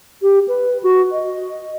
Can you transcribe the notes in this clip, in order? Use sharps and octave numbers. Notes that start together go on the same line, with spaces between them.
G4
B4
F#4
D#5